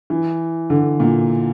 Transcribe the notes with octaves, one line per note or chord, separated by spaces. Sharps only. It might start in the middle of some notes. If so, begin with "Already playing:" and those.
E3
D3
A#2